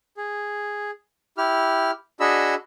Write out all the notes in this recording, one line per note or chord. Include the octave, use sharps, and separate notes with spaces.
G#4
E4 G4 F6
D4 F#4 G#4 D#5 B5 E6